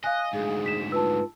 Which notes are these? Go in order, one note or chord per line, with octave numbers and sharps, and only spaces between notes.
D#5 F5 G#5 F#6
D2 G#2 G#4
B6 E7
F4 B4 A5 E6